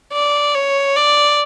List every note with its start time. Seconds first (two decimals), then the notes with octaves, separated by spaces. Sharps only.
0.13 D5
0.55 C#5
0.96 D5